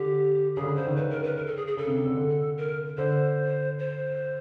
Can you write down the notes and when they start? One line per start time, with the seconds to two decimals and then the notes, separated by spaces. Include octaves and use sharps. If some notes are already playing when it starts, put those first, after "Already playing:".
Already playing: D3 G4
0.56 C#3 G#4
0.61 D3
0.66 C#3
0.76 D3 C5
0.87 D#3
0.97 C#3 B4
1.10 A#4
1.23 B4
1.37 A#4
1.46 A4
1.57 G#4
1.67 G#4
1.77 C#3 A4
1.87 C3
1.98 C3
2.07 D3
2.17 D3
2.58 A#4
2.98 D3 C5
3.79 C5